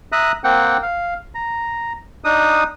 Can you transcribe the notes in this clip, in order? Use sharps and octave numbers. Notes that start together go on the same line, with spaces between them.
E5 A#5 D#6 F#6
A#3 C4 F#5 G5
F5
A#5
D4 D#4 D#6